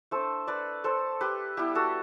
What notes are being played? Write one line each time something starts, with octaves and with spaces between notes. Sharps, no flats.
A3 D4 A4 C5
B4 D5
A4 C5
G4 B4
G3 B3 E4 G4
F#4 A4